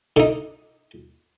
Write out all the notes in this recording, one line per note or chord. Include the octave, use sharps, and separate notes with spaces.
D3 D#4